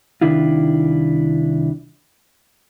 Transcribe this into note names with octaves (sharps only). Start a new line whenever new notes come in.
C2 D#3 D4 E4 F4